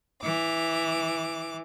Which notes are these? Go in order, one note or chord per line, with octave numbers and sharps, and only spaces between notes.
E3 D6